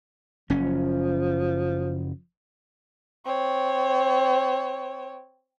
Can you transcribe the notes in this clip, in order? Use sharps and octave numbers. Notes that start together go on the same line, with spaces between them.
F#1 F3 C#4
C4 C#5